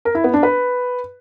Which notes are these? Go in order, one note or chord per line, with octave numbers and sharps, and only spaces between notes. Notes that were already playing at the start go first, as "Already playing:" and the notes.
A#4
E4
B3
D4
B4